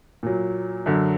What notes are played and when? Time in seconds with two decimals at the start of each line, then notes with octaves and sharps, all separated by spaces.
0.23 A#2 F#3
0.86 F#2 D3 F#3